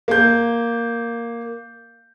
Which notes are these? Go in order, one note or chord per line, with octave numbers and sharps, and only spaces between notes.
A#3 G6